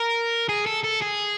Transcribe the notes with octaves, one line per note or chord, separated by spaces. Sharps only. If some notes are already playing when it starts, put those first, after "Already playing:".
Already playing: A#4
G#4
A4
A4
G#4